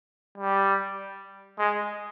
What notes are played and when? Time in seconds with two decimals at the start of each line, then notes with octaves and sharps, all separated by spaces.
0.38 G3
1.59 G#3